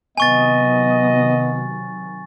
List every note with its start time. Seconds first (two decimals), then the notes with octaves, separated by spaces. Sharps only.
0.17 C3 D#3 F#3 B3 D#5 G#5 C#6 A6